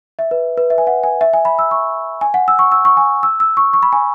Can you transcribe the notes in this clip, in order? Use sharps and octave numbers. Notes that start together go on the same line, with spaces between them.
E5
B4
B4
E5
G#5
F#5
G#5
E5
G#5
B5
E6
C#6
G#5
F#5
E6
C#6
E6
C#6
G#5
E6
E6
C#6
C#6
B5
G#5